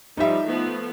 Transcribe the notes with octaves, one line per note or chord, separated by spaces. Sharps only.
F3 G3 D#4 E5
F3 A3 B3